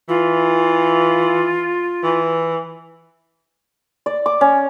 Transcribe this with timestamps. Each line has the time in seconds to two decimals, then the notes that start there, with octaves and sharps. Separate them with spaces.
0.09 E3 F4
2.03 E3
4.06 D5
4.26 D6
4.41 C#4